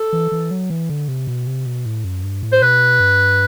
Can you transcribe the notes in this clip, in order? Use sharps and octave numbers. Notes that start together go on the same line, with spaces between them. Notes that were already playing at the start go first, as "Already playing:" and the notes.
Already playing: A4
E3
E3
F#3
E3
D3
C3
B2
C3
B2
A2
F#2
G2
A2
C5
B2 B4
G2